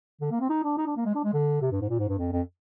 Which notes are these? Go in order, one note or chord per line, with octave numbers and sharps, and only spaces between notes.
D3
A#3
C4
D#4
D4
D#4
D4
A#3
G#3
D4
G#3
D3
C3
G2
G#2
A#2
G#2
G2
F2
F2